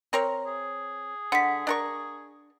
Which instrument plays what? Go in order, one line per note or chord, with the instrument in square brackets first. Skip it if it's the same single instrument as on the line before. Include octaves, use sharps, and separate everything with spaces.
[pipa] C4 A#4 C#5
[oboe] G#4
[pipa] D3 [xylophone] F#5 B6
[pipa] D4 A#4 C#6